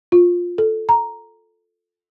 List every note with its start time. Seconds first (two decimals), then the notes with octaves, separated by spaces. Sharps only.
0.12 F4
0.58 A4
0.89 A#5